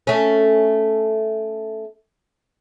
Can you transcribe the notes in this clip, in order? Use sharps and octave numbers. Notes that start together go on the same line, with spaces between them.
A3 C#4